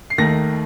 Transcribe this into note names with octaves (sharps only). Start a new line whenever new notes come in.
C7
D#2 D#3 A3 A#6